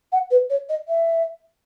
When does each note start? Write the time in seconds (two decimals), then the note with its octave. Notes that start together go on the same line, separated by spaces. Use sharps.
0.12 F#5
0.31 B4
0.50 C#5
0.69 D#5
0.88 E5